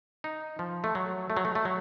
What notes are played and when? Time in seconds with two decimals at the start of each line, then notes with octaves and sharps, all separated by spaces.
0.24 D#4
0.59 F3
0.84 A3
0.95 F#3
1.30 A3
1.37 F#3
1.45 A3
1.55 A3
1.65 F#3